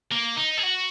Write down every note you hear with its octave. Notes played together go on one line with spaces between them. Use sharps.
A#3
D#4
G#4
F#4